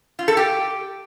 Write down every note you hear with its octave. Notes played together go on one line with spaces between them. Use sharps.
F4
A4
G4